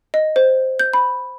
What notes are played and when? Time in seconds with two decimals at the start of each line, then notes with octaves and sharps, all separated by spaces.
0.14 D#5
0.36 C5
0.80 G6
0.93 B5